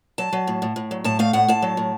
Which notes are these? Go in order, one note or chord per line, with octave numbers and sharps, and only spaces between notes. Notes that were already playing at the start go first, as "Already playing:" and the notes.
F#3 A5
F#3
A2
A2
A2
F#3
A2 A5
A3 F5
A2 F#5
A2 A5
F#3
A2